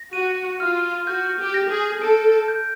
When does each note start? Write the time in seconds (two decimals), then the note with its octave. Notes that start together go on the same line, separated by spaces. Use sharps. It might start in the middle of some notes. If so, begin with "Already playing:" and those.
Already playing: A#6
0.12 F#4 D#7
0.59 F4 F6
1.07 F#4 G6
1.39 G4
1.54 A#6
1.69 G#4
2.02 A4 D7
2.48 G6